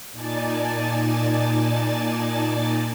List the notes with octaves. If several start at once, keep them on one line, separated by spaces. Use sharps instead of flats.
A#2 D#4 D5 G#5 A5 A6